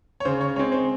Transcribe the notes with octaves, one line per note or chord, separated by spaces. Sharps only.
C#5
C#3 C5
C#5
G#3 C4 C#5
C5